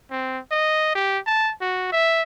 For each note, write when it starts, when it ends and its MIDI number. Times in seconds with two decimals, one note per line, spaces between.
0.11 0.39 60
0.51 0.94 75
0.95 1.19 67
1.26 1.52 81
1.61 1.92 66
1.92 2.22 76